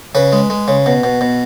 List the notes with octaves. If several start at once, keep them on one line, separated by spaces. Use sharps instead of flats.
C#3 B4
G#3
G#3
C#3
B2
B2
B2